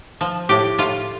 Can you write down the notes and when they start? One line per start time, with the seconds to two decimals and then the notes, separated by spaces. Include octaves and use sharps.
0.21 F3
0.49 A2 G4
0.78 A2 F4